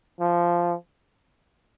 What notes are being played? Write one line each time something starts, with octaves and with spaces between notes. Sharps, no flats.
F3